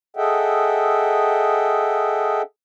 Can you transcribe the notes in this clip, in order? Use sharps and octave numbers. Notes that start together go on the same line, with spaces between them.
G#4 A4 D#5 E5 F#5 G5